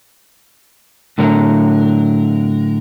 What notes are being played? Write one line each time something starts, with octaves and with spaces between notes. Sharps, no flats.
A2 D3 F#3 A#4